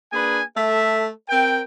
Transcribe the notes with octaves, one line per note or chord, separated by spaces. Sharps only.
A#3 D4 G#4 B4 G#5
A3 A4 E5
C4 A#4 G5